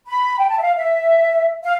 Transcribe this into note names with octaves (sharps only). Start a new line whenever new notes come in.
B5
G5
A5
E5
F5
E5
F5